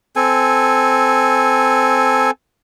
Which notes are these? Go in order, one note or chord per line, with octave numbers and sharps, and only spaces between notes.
C4 A4 G#5